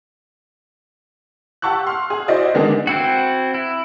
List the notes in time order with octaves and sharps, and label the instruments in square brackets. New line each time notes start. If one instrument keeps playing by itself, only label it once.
[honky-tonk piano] G4 F#5 A5 C#6 E6 F#6
C6 F6
G#4
E4 F#4 C5 D5 D#5
D3 D#3 G#3 B3 D4 G#4
[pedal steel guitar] C4 E4 F#4
E4